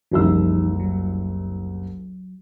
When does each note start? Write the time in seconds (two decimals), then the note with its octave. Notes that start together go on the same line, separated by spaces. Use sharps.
0.12 F#1 C2 E3 F3 D#4 E6
0.80 F#3